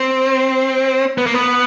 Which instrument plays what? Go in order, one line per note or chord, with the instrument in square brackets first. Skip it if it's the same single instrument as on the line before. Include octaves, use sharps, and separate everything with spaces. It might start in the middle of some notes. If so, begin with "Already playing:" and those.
Already playing: [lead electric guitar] C4
B3
A#3
B3